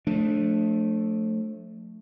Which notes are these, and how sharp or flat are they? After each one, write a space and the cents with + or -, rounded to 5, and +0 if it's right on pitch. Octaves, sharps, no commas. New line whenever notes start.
F3 +35 A3 +0 D4 +0